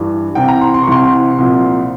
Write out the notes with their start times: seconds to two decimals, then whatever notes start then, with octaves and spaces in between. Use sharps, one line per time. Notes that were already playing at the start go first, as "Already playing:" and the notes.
Already playing: G2 E3
0.35 C2 C3 E3 G5
0.48 A#5
0.61 C6
0.74 C6
0.83 C#6
0.87 C2 C3 E3 C6
1.38 C2 A#2 F3